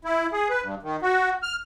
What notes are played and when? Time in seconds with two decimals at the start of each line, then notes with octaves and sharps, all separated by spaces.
0.05 E4
0.33 G#4
0.50 B4
0.62 G2
0.83 D#3
1.02 F#4
1.43 F6